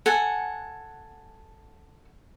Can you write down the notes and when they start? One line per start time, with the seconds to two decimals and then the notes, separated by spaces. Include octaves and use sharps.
0.06 A4 F#5 G#5